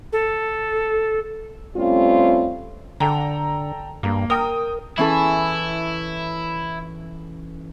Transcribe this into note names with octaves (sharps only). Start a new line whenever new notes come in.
A4
G3 A3 C4 C#4 F4
D3 A4 G5 A#5
G2 A#3
A#4 G5 D#6
E3 C#4 E4 A4